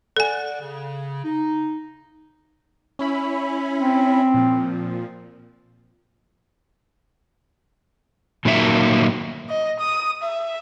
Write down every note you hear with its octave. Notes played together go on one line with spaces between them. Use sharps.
A4 D5 F#5 G#5
C#3
D#4
C#4 E4 B5
C4
A#2 F3
A#2 D#3 F#3 A#3 D4 E5
D#5
D#6
E5